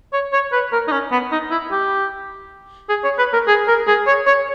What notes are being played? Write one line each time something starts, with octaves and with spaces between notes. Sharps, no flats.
C#5
C#5
B4
A#4
D#4
C#4
B3
D#4
E4
G4
G#4
C#5
B4
A#4
G#4
A#4
G#4
C#5
C#5